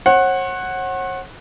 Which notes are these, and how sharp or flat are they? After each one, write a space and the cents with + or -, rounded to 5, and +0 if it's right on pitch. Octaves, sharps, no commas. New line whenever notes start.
C#5 -45 F#5 +0